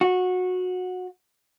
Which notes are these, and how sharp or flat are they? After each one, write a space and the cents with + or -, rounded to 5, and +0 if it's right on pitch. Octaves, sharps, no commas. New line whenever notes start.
F#4 -20